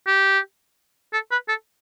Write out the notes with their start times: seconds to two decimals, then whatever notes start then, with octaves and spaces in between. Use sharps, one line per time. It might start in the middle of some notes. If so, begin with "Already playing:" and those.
0.07 G4
1.13 A4
1.32 B4
1.49 A4